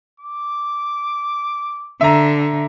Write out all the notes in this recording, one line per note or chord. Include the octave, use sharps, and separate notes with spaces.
D6
D3 E5 A#5